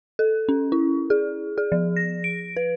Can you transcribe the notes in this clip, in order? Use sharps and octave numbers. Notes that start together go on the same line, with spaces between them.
A4
C#4
E4
G#4
G#4
F3
A#6
D7
B4